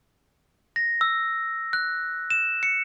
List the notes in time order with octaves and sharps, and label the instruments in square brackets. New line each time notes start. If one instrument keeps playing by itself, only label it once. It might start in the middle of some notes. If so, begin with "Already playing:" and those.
[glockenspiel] A#6
E6
F#6
E7
C#7